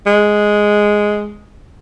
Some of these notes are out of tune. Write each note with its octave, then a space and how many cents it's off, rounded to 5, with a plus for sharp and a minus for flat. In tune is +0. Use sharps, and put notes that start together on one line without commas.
G#3 +0